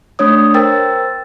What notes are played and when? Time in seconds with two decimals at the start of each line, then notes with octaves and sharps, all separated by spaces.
0.19 A3 D4 C#5 D#6
0.54 A#4 C5 G5 E6 A6